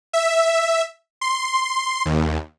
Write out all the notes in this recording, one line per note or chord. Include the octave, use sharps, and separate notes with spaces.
E5
C6
D#2